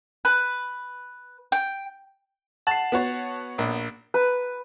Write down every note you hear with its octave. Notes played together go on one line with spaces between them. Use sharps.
B4
G5
F#5 A5 C7
B3 F#4 C#5
A#1
B4